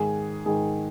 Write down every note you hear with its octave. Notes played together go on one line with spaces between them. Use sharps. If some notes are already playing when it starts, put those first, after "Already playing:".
Already playing: G#2 D#3 G#4
G#2 D#3 G#4